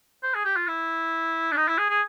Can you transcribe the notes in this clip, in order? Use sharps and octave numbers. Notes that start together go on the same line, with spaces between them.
C5
G#4
G4
F4
E4
D4
D#4
E4
G#4
G#4